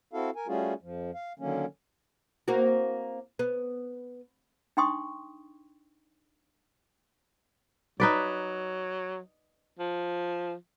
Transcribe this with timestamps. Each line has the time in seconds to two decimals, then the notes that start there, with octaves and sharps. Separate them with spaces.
0.13 C4 E4 F#4 A4 F5
0.36 A#4 G#5
0.47 G3 A3 C#4 F4 F#4 G#4
0.82 F2 F3
1.14 F5
1.39 D3 D#3 F#3 A#3 C#4
2.48 A#3 C4 F#4
3.39 B3
4.77 D4 D#4 G5 C6 C#6 D#6
8.00 F#3 D#4 B4 D5
9.79 F3